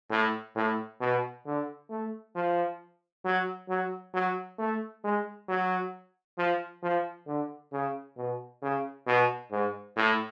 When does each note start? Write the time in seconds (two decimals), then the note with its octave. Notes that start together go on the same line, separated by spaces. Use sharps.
0.11 A2
0.56 A2
1.01 B2
1.46 D3
1.90 A3
2.36 F3
3.25 F#3
3.69 F#3
4.14 F#3
4.59 A3
5.05 G#3
5.49 F#3
6.38 F3
6.83 F3
7.27 D3
7.73 C#3
8.17 B2
8.63 C#3
9.07 B2
9.52 G#2
9.97 A2